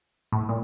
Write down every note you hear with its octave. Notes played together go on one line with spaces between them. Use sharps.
A2
A#2